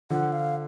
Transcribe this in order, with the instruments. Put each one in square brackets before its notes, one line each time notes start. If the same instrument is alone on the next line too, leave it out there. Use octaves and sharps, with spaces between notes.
[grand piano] D3 F3 [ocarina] F#5
[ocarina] F5